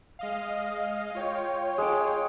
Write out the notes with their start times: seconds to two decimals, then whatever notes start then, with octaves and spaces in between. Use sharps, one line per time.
0.19 G#3 D#5 F5
1.15 F4 C#5 G5
1.78 G#3 D6